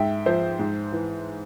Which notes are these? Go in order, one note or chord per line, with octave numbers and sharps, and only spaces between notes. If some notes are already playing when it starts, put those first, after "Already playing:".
Already playing: G#2 E5 G5
F3 C5 E5
G#2
E3